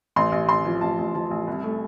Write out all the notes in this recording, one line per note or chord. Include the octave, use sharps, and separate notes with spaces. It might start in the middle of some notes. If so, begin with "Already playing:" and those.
A1 C6
A1
A1 C6
F3
A1 A5
A1
F3 A5
A1
C2
A3